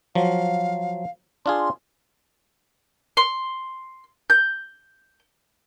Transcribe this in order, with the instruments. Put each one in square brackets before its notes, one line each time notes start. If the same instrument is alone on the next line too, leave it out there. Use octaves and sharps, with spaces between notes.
[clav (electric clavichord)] F3 F#3 [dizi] F5
[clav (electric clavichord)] D4 F4 G#4 [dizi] C6
[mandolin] C6
G6